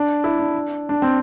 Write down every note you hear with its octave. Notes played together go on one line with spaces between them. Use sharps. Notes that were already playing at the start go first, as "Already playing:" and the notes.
Already playing: D4
E4
D4
D4
C4